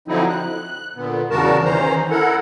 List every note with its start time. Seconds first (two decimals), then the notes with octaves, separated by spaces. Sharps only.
0.08 D3 F3 F#3 C4 D#4 E4
0.29 F#6
0.96 A#2 D3 B3
1.30 E2 C#3 G3 F#4 A#4 A5
1.65 D#3 E3 C#4 C5 A#5
2.10 E4 A4 A#4 F#5